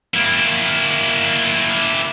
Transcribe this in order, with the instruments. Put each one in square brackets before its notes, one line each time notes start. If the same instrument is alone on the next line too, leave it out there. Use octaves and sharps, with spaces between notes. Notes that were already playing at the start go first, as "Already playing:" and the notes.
[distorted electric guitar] A#3 E4